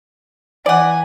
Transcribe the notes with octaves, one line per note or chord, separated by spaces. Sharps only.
E3 D5 F#5 G#5